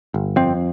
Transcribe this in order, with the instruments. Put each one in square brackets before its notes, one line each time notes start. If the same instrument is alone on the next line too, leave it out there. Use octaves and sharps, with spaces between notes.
[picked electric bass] G1
F2 C4